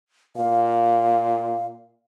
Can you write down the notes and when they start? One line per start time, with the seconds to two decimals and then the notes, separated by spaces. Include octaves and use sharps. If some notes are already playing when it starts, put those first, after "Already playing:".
0.36 A#2 F5